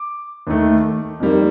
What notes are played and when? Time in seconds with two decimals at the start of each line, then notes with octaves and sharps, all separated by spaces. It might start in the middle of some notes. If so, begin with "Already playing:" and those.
Already playing: D6
0.47 D#2 D#3 A3
1.20 F2 D#3 G3 A#3